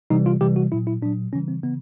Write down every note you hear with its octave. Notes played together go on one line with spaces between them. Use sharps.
C3 E3 G3 D#4
F4
C3 E3 G3 G4
F#4
A#2 F#3 E4
E4
A#2 F#3 D4
C#3 E3 G3 C#4
C4
C#3 E3 B3